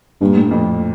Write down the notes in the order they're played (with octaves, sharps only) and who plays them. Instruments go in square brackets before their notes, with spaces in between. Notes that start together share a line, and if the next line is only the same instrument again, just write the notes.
[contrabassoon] G2 [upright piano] A#2
[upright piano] A2
F2